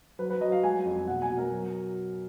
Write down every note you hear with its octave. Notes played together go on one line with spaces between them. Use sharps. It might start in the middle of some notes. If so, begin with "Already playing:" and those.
F#3 B4
B4
F#3 D#5
F5
G#3 G#5
F2
B2 F#5
G#5
B2
A#4
F#3